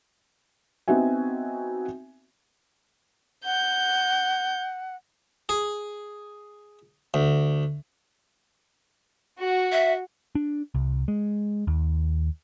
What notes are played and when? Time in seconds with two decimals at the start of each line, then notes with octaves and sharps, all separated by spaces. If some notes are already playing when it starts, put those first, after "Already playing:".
0.88 B3 C4 D#4 F#4 E5 G#5
3.45 F#5 G6
5.49 G#4
7.14 D2
9.39 F#4
9.72 E5
10.35 D4
10.75 C2
11.08 G#3
11.67 D#2